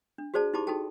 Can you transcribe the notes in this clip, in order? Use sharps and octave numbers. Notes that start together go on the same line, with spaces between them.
D4
F#4 G#4 C5 D5 A5
D#4 E4 G4 A5 B5 D6
D#4 F#4 A4 G5 A5